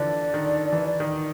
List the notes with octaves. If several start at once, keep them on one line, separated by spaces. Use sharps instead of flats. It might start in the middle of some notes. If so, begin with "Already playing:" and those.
Already playing: D3 E3 F3 D5
D#3
E3
D#3